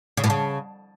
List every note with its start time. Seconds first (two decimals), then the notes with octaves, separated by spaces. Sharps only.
0.17 C#3
0.24 A2
0.30 C#3